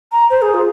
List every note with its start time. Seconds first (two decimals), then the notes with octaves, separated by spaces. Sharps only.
0.12 A#5
0.30 C5
0.42 G#4
0.54 F4